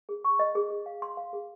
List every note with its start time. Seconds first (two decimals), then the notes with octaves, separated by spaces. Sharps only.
0.09 G#4
0.24 C#6
0.39 D#5
0.55 G#4
0.71 G#4
0.86 F5
1.02 C6
1.17 F5
1.33 G#4